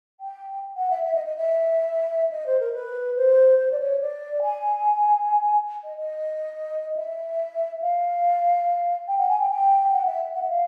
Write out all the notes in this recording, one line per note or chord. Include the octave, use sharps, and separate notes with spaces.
G5
F#5
E5
E5
D#5
D#5
E5
D#5
C5
A#4
B4
C5
C5
D5
C#5
D5
G#5
D#5
D#5
E5
F5
G5
F#5
G#5
G5
G5
G5
F#5
E5
F#5
E5
F5